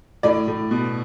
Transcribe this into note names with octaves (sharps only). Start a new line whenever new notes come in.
A2 D5
A2
B2